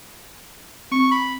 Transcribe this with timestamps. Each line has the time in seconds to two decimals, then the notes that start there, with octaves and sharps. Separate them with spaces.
0.92 C4 C#6
1.11 B5